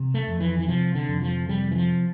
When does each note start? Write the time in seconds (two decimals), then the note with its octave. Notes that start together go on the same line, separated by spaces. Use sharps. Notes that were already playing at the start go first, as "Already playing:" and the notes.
Already playing: C3
0.14 A3
0.27 F2
0.40 E3
0.59 E3
0.68 C3 F3
0.95 D3
1.08 F2
1.21 F3
1.49 C3 G3
1.71 E3
1.76 F3